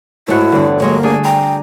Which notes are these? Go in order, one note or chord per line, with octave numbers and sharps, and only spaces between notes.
G#2 A3 E4 F#4 C#5
G1 E2 D3
F#3 G#3 A#3 C#5
A3 D4 G#4 G#5
G5 A#5